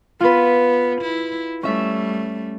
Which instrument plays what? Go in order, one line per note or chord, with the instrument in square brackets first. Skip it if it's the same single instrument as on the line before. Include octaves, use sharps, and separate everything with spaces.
[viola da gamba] B3 [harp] F4 B4
[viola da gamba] E4
[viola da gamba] G3 A3 [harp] C#4 E5